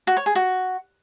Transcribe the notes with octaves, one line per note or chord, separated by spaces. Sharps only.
F#4
C#5
G#4
F#4